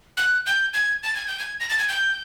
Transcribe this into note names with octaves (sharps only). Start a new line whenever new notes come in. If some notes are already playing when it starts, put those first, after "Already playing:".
F#6
G6
G#6
A6
G#6
G6
G#6
A#6
A6
G#6
G6